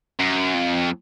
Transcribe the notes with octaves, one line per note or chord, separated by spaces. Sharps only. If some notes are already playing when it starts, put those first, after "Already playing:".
F#2
F2